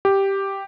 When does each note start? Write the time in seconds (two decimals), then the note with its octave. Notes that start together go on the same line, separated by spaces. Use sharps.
0.05 G4